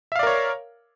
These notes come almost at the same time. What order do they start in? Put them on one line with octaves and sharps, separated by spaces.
E5 F5 D5 A#4 C#5